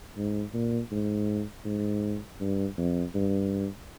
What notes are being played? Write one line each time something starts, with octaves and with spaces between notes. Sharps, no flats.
G#2
A#2
G#2
G#2
G2
F2
G2